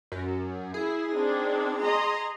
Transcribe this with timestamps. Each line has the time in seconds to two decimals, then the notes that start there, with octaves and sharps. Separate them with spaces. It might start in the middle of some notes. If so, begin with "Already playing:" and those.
0.12 F#2
0.74 E4 G#4
1.13 C4 D4 D#4
1.82 D#5 A#5 C6